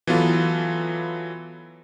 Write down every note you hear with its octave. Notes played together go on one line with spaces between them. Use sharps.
E3 F#3 B3 F4 A4